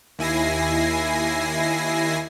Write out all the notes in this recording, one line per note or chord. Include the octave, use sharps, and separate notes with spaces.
D#2 E4 G#5 A#6 C7